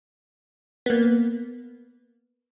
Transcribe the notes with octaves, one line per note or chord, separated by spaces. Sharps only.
A#3 B3